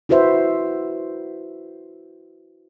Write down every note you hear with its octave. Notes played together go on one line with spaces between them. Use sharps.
E4 F#4 B4 C5 E5